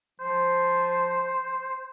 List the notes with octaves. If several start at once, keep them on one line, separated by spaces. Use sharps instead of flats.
F3 C5